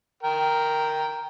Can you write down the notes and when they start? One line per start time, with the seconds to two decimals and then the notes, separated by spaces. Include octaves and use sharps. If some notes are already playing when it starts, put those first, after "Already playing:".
0.23 A#4 G5